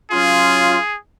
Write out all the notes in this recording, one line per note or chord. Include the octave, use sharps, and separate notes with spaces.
F#3 C#4 F4 G#4